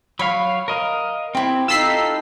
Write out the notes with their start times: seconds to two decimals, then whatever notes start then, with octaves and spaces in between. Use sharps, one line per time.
0.19 F#3 C#5 F5 B5
0.68 A#4 D#5 F5
1.35 C4 E4 G4
1.68 D#4 F4 A4 B5 E6 B6 C7